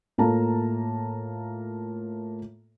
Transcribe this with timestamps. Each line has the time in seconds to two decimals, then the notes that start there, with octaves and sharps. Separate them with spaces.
0.18 A2 A#3 F4 A4 A5 A#5